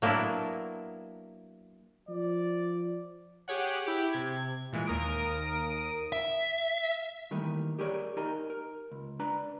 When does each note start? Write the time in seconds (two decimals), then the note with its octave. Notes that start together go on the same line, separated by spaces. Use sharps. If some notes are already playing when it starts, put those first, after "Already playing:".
0.02 F#3 A#3 B3 D4 E4
2.09 F3 D5
3.48 G4 G#4 C#5 F#5
3.86 E4 G4
4.13 C3 G#6
4.73 A#2 E3 G#3
4.86 D#2 A#4 D#6 D7
6.12 E5
7.31 D#3 E3 G3 A3 A#3 D#4
7.79 G4 G#4 A#4 C#5 D5
8.17 D#4 G4 A#4 D#5 G#5 A#5
8.50 A#4
8.92 C#2
9.20 D4 B4 D5 A#5